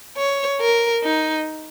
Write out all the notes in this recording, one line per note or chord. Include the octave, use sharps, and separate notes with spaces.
C#5
A#4
D#4